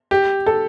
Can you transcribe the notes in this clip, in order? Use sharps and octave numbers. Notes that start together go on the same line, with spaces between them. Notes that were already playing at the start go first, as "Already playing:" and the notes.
G4
A4